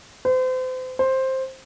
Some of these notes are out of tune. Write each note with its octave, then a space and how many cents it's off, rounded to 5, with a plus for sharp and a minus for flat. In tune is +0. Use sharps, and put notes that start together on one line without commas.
C5 -35
C5 +10